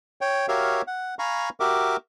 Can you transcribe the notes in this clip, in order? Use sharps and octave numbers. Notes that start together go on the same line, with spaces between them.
C#5 G5
F#4 G4 A#4 C#5 E5 F5
F#5
F5 G#5 A#5 B5 C#6
F#4 G4 A#4 E5 D6